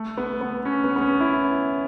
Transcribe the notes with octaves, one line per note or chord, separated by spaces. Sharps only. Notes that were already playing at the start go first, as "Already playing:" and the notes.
Already playing: A3
B3
B3
C#4
B3
B3
C#4
E4